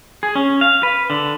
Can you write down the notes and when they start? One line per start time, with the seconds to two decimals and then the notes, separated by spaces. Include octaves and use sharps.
0.23 G#4
0.35 C#4
0.61 F5
0.83 B4
1.10 D3